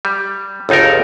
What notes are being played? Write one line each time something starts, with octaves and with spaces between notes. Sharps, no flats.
G3
G1 C#2 D#4 A4 A#4